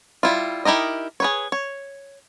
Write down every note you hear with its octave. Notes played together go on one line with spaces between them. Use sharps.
G3 E4 F4
D#4 E4 G4 A#4 D#5
G#4 B4 C#5
C#5